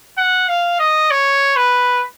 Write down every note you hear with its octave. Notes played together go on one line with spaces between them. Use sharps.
F#5
F5
D#5
C#5
B4